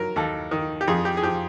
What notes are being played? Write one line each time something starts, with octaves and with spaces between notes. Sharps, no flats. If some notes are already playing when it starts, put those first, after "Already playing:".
Already playing: F#3 A#4
D#2 A4
D#3
G4
F2 G#4
G4
G#4
F3 G4